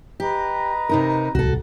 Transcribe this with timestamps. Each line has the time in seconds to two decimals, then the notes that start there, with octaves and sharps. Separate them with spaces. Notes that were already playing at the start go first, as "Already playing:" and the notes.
0.20 G4 B4 D#5 A#5
0.89 C3 D#4 A#4
1.35 D1 C2 F#4 A4